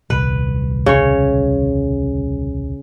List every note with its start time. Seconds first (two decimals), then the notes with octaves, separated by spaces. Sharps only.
0.10 D#1 C2 B4
0.86 C#3 C#5